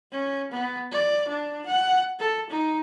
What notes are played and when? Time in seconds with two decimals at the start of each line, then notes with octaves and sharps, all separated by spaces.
0.12 C#4
0.52 B3
0.92 D5
1.29 D4
1.67 F#5
2.20 A4
2.50 D#4